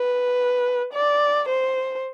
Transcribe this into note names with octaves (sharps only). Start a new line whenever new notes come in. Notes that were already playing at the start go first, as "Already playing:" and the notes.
Already playing: B4
D5
C5